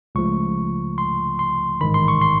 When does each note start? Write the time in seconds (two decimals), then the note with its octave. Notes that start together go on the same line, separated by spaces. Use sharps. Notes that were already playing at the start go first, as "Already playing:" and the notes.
0.15 C#2 C#3 F3 A3 C#6
0.98 C6
1.39 C6
1.81 A1 G#2 D#3 B5
1.94 C6
2.08 C#6
2.21 C6